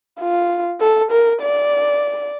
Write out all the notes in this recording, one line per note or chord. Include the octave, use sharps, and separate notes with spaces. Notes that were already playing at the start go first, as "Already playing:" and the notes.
F4
A4
A#4
D5